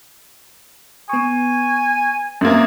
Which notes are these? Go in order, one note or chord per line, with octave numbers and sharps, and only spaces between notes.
B3 G#5 C#6
F#2 A#3